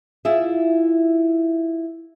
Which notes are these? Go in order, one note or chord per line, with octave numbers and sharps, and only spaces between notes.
E4 F4 G#4 E5